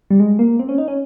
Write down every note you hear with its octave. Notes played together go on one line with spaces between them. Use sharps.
G3
G#3
A#3
C4
C#4
D#4
C#4